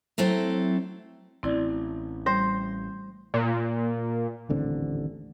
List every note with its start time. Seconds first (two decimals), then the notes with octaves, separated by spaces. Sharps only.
0.18 F#3 A3 C4 E4 A4
1.43 A1 C4 E4 D5
2.26 G3 C5
3.34 A#2
4.49 D#1 A1 D3 C4